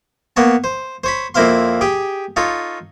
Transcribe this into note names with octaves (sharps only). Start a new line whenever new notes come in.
A#3 B3 C#5 A5
C5
C5 C#5 B5
F2 A#3 E4 C5 F5 C6
G4 G#4 G5
D#4 F4 A4 C#5